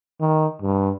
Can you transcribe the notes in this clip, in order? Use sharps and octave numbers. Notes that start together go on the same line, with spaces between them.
D#3
G2